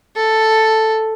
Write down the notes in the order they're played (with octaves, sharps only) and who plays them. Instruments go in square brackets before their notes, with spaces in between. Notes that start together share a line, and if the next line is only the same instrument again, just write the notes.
[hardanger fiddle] A4